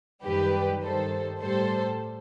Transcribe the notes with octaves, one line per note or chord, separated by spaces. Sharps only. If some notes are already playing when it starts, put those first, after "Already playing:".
F#2 D#3 G3 G4 B4
G2 D#3 G3 A4 C5
A2 G3 A4 C5